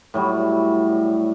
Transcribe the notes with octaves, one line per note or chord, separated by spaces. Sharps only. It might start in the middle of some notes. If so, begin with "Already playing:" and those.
A2 F#3 G3